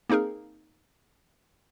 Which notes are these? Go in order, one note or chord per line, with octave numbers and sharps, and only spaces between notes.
A#3 C4 D#4 G#4 A#4